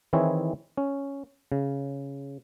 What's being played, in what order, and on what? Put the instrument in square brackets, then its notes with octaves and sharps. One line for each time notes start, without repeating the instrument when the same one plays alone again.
[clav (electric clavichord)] D#3 E3 C4 E4 G#4 C#5
C#4
C#3